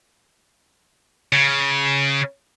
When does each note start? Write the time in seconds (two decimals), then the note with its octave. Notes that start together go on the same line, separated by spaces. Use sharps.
1.32 C#3